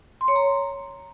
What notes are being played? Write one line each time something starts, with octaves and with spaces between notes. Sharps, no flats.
C6
C#5
A#5